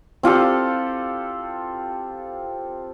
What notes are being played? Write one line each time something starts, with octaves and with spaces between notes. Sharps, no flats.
C4 F4 G4 A4